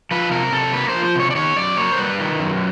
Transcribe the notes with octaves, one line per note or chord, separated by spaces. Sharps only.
F3 B4
C3 A#4
C3 A4
A#3 B4
C5
F3
C5
C3 C#5
D5
D#3 C#5
F#2 D5
A#3 C#5
C5
G3 B4
D#3
F#2